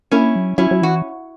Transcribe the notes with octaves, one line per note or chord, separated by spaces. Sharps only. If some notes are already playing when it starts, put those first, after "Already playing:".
A#3 C#4 E4
F#3
F#3 C#4 E4
F#3
E3 F#4